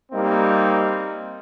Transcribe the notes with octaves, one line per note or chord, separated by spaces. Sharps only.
G3 A#3 C4 D#4